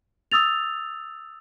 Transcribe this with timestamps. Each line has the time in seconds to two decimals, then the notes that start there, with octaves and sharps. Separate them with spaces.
0.32 D#6 E6 A6 F7